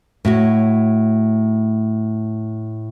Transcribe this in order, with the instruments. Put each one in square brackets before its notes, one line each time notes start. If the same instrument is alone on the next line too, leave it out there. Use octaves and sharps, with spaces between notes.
[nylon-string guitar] A2 F#4 C#5